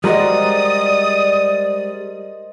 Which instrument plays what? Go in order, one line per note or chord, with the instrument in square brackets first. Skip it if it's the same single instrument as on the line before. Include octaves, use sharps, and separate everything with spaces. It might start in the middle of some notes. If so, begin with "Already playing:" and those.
[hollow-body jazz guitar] G3 G#3 F#4 [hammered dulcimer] A#4 C5 D#5 [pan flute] D5 [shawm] D#6